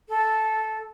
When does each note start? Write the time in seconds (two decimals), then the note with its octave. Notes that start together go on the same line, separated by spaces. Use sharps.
0.09 A4